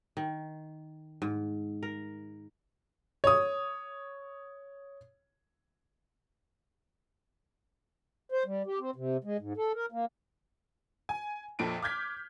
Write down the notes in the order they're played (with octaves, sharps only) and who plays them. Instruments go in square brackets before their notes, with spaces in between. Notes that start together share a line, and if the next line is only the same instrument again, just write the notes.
[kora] D#3
G#2
A#4
[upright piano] C#5 D#6
[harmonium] C5
G3
G4
C4
C3
G#3
G#2
A4
A#4
A#3
[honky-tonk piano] G#5
A#1 F2 A#2 A4 D7
D6 F6 G6 G#6 B6